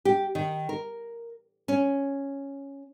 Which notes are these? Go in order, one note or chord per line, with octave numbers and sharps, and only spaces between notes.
G4
D#3
A#4
C#4